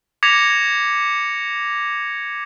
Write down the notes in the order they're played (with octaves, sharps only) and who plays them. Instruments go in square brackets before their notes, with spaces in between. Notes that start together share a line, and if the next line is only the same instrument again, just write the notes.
[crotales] D6 G#6 A#6 B6 C#7 F7